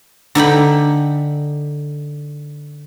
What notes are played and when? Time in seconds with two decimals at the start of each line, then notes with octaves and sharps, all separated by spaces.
0.35 D3 D#4 G5 B5